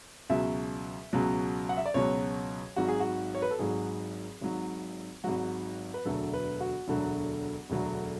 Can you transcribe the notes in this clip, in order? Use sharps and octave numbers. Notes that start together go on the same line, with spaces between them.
C#2 B2 F#3 E5
C#2 B2 F#3
F#5
E5
D5
C#2 B2 F#3 C#5
G#1 G#2 F#3 F#4
G#4
F#4
C#5
B4
A4
G#1 G#2 F#3 G#4
G#1 G#2 F#3
G#1 G#2 F#3 F#4
B4
E1 D2 D3 F#3 A4
B4
F#4
E1 D2 D3 F#3
E1 D2 D3 F#3